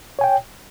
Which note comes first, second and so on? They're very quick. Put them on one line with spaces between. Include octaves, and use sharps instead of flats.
C#5 G#5 G5